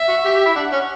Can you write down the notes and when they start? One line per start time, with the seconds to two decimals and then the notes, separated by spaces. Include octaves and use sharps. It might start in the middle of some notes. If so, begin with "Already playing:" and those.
Already playing: E5
0.09 F#4
0.25 G4
0.36 G4
0.46 E4
0.56 D4 F#5
0.72 C#4